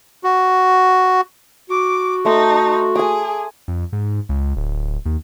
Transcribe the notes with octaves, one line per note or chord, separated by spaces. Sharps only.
F#4
F#4 D6
A3 D#4 C6
G#4 G#5 D6
F2
G#2
C#2
D1
D#2